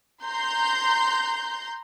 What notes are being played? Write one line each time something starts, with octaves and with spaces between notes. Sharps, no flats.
A#5 C6 G6